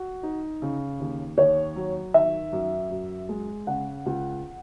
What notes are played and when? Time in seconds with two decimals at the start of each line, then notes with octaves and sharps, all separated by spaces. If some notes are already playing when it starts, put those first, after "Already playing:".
Already playing: F#4
0.23 D#4
0.62 C#3
1.00 D#2
1.38 D#2 C#5
1.76 F#3
2.14 D#3 E5
2.52 F#2
2.90 F#2
3.29 G#3
3.67 C#3 F#5
4.06 C#2